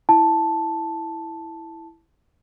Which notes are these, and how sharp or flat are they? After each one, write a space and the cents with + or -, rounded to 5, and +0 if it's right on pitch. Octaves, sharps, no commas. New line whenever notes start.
E4 +0 A5 +0